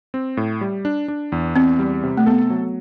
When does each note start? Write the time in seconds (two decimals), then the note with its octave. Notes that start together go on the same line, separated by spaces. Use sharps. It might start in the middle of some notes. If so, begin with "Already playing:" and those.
0.14 C4
0.37 A2
0.61 G3
0.85 D4
1.08 D4
1.32 E2
1.56 E2 C4
1.79 G3
2.03 C3
2.17 A3
2.26 B3 A4
2.50 F#3